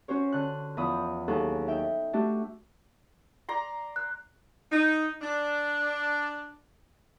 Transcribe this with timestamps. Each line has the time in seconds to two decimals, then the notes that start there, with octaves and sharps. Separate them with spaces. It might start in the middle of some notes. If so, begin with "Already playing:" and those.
0.08 C#4 F#4 C5 C#5
0.32 D3 F#6
0.77 E2 F3 B5 D#6 F#6
1.28 D#2 F#3 G#4 A4 F#6
1.67 D#4 E5 G5
2.13 A3 D4 F#4 G4
3.49 D5 A#5 C6
3.96 F#6
4.71 D#4
5.22 D4